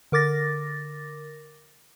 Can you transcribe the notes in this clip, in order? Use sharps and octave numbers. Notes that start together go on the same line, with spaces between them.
D3 A#4 D6 A6 A#6